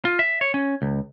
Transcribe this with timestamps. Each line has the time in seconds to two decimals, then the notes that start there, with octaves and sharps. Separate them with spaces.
0.05 F4
0.19 E5
0.41 C#5
0.54 C#4
0.82 C#2